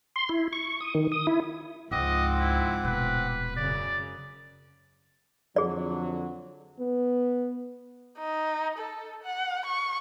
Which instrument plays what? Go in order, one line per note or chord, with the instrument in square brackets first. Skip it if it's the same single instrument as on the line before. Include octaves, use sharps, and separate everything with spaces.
[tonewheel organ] C6
E4
C#6
D#6
D#3
D#6
E4
[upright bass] C#2 [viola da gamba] G#2 F3 [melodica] C4 F#5 D6 [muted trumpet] D#5
[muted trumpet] E4
[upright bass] D#1 B2 [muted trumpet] B4
[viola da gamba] F#2 C#3 [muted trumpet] D5
[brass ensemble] F2 D3 F#3 [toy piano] G#4 D5
[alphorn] B3
[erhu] D#4
A4
F#5
C#6